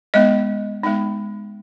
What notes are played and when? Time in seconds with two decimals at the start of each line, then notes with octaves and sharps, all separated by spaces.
0.14 G#3 B3 D#4 D#5
0.83 G#3 B3 D#4